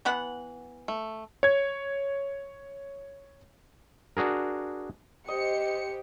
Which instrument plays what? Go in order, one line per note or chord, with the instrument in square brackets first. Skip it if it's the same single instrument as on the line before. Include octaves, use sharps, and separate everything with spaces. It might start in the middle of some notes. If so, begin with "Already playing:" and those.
[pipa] E3 B3 F#5
[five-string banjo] A3
[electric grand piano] C#5 G#6
[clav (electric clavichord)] D4 F#4 G#4 A#4
[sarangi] G4 [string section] C5 C#7 [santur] D#5